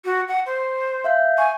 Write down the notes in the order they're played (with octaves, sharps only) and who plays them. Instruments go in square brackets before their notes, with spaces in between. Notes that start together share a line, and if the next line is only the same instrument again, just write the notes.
[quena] F#4
F#5
C5
[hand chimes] E5 F5 G6
[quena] G#5 [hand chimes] C#6 G#6